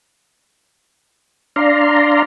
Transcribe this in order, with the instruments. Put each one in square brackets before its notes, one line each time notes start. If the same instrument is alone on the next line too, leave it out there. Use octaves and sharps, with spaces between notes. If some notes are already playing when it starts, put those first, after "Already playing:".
[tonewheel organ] D4 D5 F5 A#5 C6